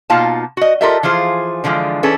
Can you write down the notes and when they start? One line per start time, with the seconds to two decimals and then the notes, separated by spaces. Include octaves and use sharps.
0.10 B2 A#3 D#4 F4 F5 A5
0.57 F#4 D#5
0.81 F4 G4 A4 A#4 D#5 E5
1.03 E3 F3 F4 G#4 C5
1.64 D3 E3 F3 G#3 F4
2.03 E3 C#4 G#4 A4 B4